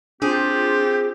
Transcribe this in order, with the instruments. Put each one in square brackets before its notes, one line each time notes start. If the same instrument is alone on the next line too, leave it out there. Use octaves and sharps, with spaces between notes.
[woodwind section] C4 F4 [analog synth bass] D4 [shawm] G4 [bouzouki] G#4